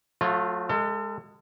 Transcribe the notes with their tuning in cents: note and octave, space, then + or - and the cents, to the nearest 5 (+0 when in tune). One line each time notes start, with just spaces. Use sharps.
F#3 -40 A3 +0 F4 +0
G#3 -15 A4 +35 E5 +15